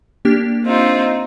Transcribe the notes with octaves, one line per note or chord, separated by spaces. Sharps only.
A#3 D4 G4
C4 D#4 F4